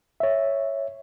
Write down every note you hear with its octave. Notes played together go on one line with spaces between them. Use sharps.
C#5 E5